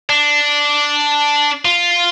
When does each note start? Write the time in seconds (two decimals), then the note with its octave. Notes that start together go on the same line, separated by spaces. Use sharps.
0.09 D4
1.65 F4